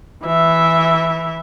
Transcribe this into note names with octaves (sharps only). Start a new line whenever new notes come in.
E3 E5